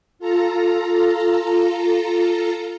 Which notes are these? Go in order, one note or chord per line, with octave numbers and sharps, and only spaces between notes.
F4 A4 A#5